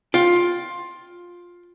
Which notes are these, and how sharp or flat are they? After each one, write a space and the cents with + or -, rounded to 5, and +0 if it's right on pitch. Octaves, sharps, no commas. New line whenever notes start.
F4 +10 G5 -5